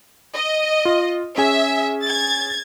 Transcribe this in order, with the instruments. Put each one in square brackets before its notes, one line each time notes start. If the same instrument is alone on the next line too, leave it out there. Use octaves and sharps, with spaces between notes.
[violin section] D#5
[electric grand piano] F4
[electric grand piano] C#4 G#4 G#5 [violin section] E5
[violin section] G#6 A6